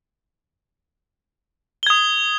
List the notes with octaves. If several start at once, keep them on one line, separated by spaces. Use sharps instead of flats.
D#6 G#6 G7